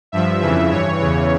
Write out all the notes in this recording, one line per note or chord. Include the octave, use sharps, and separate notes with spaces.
G2 F3 E5
F2 C#3 E3 E5
G2 E3 C#5
E2 C#3 E3 C#5